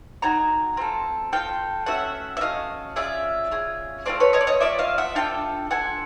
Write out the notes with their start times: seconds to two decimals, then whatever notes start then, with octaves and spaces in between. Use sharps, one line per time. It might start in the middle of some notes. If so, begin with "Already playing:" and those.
0.22 C4 D#4 F#4 G#5 A#5
0.77 C4 F4 A4
1.32 C4 F4 A4 F5 G5
1.86 A3 C#4 F#4 E5 F#5
2.37 E5
2.41 A3 C#4 F#4 D#5 F5
2.96 C#4 F4 G#4 D5 E5
3.51 C#4 F4 G#4
4.06 A3 C4 F4 C5 D5
4.20 B4 C#5
4.33 C#5 D#5
4.41 D5
4.47 C#5 D#5
4.60 A3 C4 F4 D5 E5
4.79 D#5 F5
4.98 E5 F#5
5.15 D4 F4 A4 F5 G5
5.70 D4 F4 A4 F#5 G#5